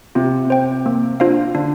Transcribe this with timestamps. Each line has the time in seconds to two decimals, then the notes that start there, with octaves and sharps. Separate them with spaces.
0.15 C3 F4
0.50 C5 G5
0.86 A#3
1.20 D4 F4 C5 F5
1.54 D3 D4